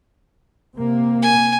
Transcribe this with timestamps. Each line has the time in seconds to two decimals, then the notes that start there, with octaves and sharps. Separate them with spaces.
0.76 C3 A#3
1.22 G#5